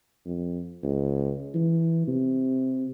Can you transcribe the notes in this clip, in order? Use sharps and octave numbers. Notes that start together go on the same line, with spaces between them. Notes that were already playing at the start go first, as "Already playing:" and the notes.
F2
C#2
E3
C3